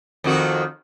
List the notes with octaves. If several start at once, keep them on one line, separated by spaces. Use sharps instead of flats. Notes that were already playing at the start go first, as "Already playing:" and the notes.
F2 D#3 F#4